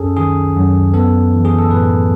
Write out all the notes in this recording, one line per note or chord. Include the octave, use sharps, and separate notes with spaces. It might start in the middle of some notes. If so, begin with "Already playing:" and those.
Already playing: F#2 C#4 G#4 A4
D#3 G#4
F#2
B3 A4
E3
G#4
A4
A2 B4